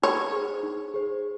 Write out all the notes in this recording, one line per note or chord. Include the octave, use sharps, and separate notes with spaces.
D#4 C#5
G#4 C5
D#4
G#4 C5